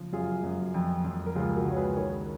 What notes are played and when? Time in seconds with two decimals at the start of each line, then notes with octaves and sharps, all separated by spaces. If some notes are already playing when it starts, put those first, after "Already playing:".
Already playing: C#3 F3
0.13 F#2 F4 G#4
0.43 F#2
0.74 F2
1.04 F2
1.26 A#4
1.35 C#2 F4 G#4
1.56 F#4 A#4
1.66 C#2 C#5
1.76 G#4 B4
1.96 D#3 A#4 C#5